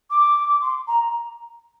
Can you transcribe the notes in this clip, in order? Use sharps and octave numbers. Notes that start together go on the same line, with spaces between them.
D6
C6
A#5